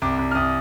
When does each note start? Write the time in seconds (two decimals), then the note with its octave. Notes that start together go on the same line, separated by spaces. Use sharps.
0.02 C2 D6
0.19 C2
0.31 F6
0.35 C2 D#6